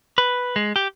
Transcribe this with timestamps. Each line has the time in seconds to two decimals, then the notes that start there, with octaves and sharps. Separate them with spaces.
0.18 B4
0.56 G#3
0.76 G4